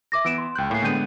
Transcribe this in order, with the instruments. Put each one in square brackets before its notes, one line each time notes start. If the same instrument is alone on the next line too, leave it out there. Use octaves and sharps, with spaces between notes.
[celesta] E5 D6 A#6
[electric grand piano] E3 B3 [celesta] E6 D7 E7
[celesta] C6
[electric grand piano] C#2 F#6 [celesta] G5 G6
[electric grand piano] A2 A#3 [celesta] C#5 G#5 C7
[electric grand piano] D3 G#3 B3 [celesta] G5 G6 D#7